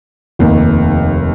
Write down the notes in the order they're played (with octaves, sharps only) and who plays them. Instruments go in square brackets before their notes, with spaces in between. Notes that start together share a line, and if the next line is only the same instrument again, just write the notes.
[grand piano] F1 D#2 D#3